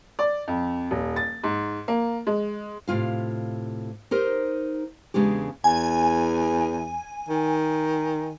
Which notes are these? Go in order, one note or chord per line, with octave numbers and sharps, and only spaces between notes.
D5
F2
D#1
A6
G#2
A#3
G#3
A2 C3 G#3 F4 F5
D#4 G4 A#4 C5
E2 C#3 G#3 D4 G4
E2 G#5
D#3